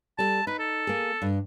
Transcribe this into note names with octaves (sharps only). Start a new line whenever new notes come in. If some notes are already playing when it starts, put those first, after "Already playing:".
G3 A4 A5
D#4 B4
A4
A#3 G#4
G2